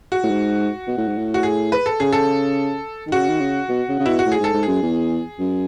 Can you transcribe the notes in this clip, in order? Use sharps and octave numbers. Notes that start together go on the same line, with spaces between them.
F#4
A2
G#2
B2
A2
G#2
A2
F#4
G#4
B4
A4
C#3 G#4
A4
D#3
C#3 F#4
D#3
C#3
B2
C#3
C#3
B2 E4
F#4
A2
G#4
G#2 A4
G#2
F#2 G#4
E2
F#2